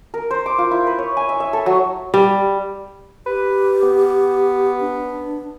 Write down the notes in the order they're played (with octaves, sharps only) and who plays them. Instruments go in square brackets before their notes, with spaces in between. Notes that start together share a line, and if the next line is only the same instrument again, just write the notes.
[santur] A#4
C5
D6
F4
E4
B4
C#5
G#5
E5
E5
A4
F#3
[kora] G3
[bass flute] G4 [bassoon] B4
[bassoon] B3
[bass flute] D4